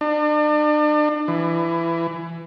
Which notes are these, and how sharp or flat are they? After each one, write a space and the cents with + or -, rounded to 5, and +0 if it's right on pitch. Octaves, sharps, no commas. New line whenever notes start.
D4 +40
E3 +25